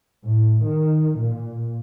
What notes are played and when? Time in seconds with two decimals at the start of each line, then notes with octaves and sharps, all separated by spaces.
0.24 A2
0.64 D#3
1.20 A#2